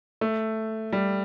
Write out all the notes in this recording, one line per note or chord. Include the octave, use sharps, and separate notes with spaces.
A3
G3